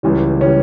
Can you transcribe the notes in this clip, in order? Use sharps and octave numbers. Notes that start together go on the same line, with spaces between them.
C#2 C#3 E3 G3
C#3 E3 G3 C#4